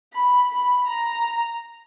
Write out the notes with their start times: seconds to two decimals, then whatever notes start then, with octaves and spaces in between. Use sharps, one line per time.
0.13 B5
0.50 B5
0.87 A#5